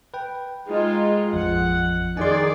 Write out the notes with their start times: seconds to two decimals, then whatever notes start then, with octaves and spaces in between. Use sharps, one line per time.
0.14 B4 G5
0.67 G#3 D#4 F4
1.33 A1 F2 F3 F#5
2.17 D#3 G#4 D5 G#5 C6